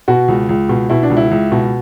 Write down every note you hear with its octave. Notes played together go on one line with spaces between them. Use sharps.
B2 F#4
C#2
C#2
B2
B2 E4
D4
C#2
E4
C#2
B2